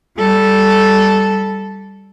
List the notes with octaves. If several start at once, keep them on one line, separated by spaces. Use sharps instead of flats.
G3 A4